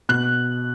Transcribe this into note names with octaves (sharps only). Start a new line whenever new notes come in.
B2 F#6